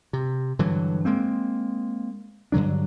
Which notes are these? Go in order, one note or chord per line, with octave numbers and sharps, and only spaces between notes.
C3
G2 D3 E3 F#3
G#3 A#3 C4
G2 D3 F#3 D4